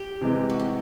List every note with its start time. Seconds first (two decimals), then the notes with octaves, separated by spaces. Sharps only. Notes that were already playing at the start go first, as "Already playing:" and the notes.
Already playing: G4
0.21 C3 E3 G#3
0.50 F#4
0.60 G4